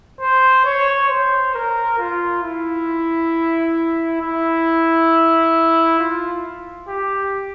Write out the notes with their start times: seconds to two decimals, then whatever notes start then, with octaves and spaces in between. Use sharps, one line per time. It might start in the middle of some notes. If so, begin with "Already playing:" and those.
0.21 C5
0.65 C#5
1.10 C5
1.54 A#4
1.99 F4
2.43 E4
4.21 E4
5.99 F4
6.88 G4